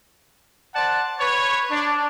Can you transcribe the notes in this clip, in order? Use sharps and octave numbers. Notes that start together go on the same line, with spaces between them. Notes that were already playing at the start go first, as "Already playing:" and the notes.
C5 D5 F#5 A5
B4 C#5
D4